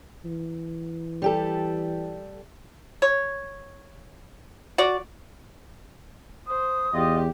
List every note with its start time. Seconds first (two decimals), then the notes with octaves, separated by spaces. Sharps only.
0.25 E3
1.22 G3 G4 A4
3.02 C#5
4.78 F#4 D5
6.47 C5 D#6
6.94 E2 F4 G4 D#5